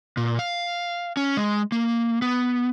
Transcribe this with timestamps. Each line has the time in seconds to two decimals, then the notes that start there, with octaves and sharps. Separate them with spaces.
0.17 A#2
0.39 F5
1.17 C#4
1.37 G#3
1.72 A#3
2.22 B3